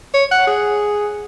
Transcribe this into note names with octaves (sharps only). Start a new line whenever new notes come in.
C#5
F#5
G#4